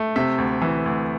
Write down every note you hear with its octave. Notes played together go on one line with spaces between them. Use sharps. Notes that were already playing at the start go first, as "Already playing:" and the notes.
Already playing: A3
C3 E5
D2
E3
D2